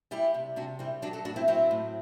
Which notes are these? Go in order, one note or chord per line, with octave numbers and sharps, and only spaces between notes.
G3 E4 G4
C3
C3 D4 F#4
G3 C4 E4
F#3 D4 F#4
F#4 A4
A2 D4 F#4
C4 E4
F#3 C4 E4
A2